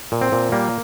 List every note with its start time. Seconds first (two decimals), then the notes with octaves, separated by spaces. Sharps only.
0.12 A#2
0.21 C4
0.32 A#2
0.52 G3 A#3